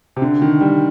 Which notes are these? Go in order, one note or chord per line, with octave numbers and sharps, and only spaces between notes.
C3
D3
D#3
G3